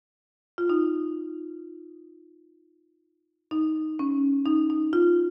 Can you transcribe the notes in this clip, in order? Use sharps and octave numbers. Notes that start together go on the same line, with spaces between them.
F4
D#4
D#4
C#4
D#4
D#4
F4